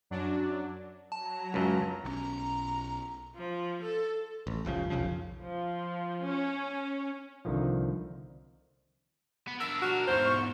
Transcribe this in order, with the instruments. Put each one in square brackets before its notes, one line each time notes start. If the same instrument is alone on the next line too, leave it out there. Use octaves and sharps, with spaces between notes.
[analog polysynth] F#2 F#3 D4
[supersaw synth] F#3 A#5 [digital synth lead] A5
[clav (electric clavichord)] C#2 F#2
[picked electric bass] B1 E3 C#4 [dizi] A#5
[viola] F3
A4
[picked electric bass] A1
F1 C2 C#3 F3
F1 B1 C#3 F3
[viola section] F3
C#4
[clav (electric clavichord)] C2 D3 D#3 F3
[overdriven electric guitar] B3
[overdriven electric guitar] D4 A#4 [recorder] E6
[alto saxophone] F#4 [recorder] F6
[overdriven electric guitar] E2 G#2 [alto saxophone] C5 [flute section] C#6